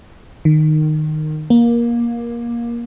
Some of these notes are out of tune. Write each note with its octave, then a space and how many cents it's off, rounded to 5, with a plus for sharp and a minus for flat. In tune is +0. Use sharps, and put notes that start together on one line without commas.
D#3 -15
A#3 +20